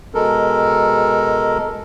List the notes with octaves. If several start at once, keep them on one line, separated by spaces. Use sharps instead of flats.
B2 G#3 A4 A#4